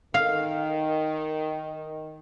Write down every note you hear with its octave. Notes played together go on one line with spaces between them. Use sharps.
D#3 F5